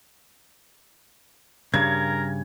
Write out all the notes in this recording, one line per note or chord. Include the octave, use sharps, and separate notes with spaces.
G2 C#3 A#4 G#6